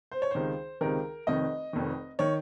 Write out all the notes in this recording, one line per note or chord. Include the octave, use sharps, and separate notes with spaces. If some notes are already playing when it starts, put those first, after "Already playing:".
C5
C#5
C#2 C3 D#3 C5
C#2 C3 D#3 A#4
F1 F2 D#3 D#5
F1 F2 D#3
D#3 C#5